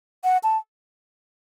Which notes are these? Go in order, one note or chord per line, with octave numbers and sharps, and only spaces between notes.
F#5
A5